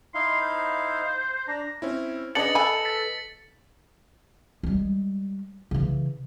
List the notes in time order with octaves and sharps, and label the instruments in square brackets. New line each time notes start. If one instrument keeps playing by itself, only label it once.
[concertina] D#4 E4 F5 [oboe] C6
[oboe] C5
[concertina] D4 [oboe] A#5
[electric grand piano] C4 C#4 E4
[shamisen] C#3 D4 [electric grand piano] B4 D#5 [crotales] A6 C#7 F#7
[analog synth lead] A4 [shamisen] G#5 B5
[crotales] A6 B6
[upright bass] G3 G#3
C#3 E3